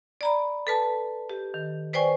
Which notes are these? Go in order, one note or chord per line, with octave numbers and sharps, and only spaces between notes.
D5 A#5 B5
A4 B4 A5
G4
D#3
B4 C5 D5 G5 G#5 C#6